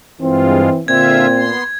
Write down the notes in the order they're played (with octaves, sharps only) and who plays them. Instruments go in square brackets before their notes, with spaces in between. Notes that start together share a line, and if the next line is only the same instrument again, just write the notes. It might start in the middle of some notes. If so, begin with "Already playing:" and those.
[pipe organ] G2 G#3 F4 [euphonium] E3 [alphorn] C4
[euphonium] A#2 [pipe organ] D3 F4 E5 [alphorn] C4 [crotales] G#6
[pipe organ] B3 C6